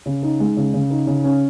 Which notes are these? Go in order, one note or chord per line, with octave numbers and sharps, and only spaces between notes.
C#3
D#4
G#3
C#3
C#3
D#4
C#3
C#4